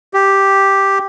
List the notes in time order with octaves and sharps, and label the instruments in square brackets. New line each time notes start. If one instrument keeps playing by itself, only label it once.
[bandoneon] G4